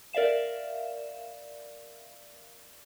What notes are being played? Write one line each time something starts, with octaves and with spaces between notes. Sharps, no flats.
A#4 D5 E5 F5 E7